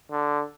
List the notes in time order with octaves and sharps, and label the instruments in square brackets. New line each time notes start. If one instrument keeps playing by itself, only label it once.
[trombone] D3